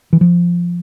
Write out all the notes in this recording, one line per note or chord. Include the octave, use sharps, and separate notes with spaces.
E3
F3